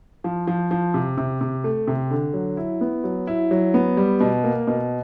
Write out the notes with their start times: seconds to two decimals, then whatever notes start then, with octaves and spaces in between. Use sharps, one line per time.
0.24 F3
0.47 F3
0.71 F3
0.94 C3
1.18 C3
1.41 C3
1.64 A3
1.87 C3
2.11 D3
2.34 F#3
2.57 E4
2.81 B3
3.04 F#3
3.27 E4
3.51 F#3
3.74 B3
3.97 G3
4.20 B2
4.44 A#3
4.67 B2